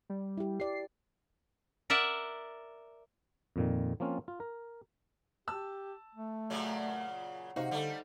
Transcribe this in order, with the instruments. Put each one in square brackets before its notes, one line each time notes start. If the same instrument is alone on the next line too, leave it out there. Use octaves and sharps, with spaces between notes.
[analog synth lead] G3
[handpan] E4 G4
[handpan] G4 D5 [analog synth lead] C7
[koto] A#4 D5 E5 F#5
[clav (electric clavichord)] F2 A#2 D#3
F3 A#3 C4 C#4 F4
F4
A#4
[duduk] G4 [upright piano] A5 E6
[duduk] A3
[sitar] A#2 C#3 F#3
[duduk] C3 [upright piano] D#4 C5 F5 [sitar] F#4
[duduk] D3 [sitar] G3 A3